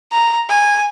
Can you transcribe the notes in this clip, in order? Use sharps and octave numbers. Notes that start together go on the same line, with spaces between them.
A#5
G#5